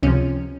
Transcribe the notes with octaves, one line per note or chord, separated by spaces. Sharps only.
C#2 C3 F3 C#4